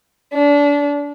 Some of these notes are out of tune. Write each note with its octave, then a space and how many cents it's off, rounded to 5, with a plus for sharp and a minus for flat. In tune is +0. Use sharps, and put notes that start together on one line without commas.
D4 -30